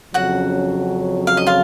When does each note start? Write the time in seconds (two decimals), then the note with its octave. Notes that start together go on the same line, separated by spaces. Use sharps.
0.14 F2 C#3 F#3 C#4 F#4 F#5
1.27 F5
1.37 D#5
1.47 F4 F5